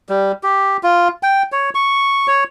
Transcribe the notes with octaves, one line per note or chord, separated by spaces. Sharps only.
G3
G4
F4
G5
C#5
C#6
C#5